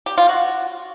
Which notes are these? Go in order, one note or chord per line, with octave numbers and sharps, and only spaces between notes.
G4
F4
F#4